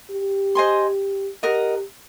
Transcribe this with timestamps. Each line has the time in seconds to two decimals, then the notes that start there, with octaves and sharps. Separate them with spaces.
0.11 G4
0.55 C5 D#5 G#5 C6
1.43 G4 A#4 D#5 F#5 A#5